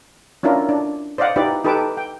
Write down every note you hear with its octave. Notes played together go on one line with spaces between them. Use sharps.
C#4 D4 E4 F4 A#4
D4
C5 D5 D#5 F5 F#5
D#4 E4 G4 B4 D5
D#4 G4 A4 B4 A5 D6
G5